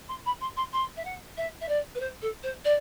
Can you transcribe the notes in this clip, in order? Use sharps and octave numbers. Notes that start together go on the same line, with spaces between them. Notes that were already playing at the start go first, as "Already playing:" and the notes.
C6
B5
C6
C6
C6
E5
F#5
E5
E5
D5
B4
C5
A4
C5
D5